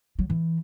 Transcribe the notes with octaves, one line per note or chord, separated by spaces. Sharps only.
F#3
E3